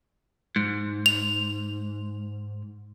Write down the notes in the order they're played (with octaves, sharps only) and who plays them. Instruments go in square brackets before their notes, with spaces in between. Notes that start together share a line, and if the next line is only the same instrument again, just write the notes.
[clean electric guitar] G#2
[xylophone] F7